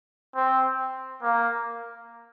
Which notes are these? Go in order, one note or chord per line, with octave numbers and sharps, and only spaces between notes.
C4
A#3